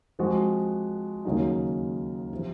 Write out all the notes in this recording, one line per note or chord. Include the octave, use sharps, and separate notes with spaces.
F3 G#3 C4 F#4
D#2 C#3 F#3 A#3 D#4
C3 F3